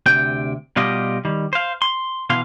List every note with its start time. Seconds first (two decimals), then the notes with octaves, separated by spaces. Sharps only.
0.06 D2 C3 G5
0.76 B2 G3 F4 G4 D#5
1.25 D#3 G3
1.53 C5 F5
1.82 C6
2.30 B2 E3 F5 C6